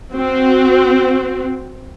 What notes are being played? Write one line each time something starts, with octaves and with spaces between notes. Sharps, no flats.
C4 F#4